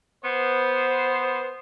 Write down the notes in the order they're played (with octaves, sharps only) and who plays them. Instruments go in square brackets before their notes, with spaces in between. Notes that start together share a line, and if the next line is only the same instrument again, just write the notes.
[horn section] B3 C5